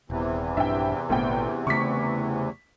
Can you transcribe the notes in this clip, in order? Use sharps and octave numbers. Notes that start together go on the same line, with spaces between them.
D#1 E2 C3 E3
A#1 G2 D4 E5 G5
G#1 D2 A#2 B3 G5
C#3 A3 C#6 D6 B6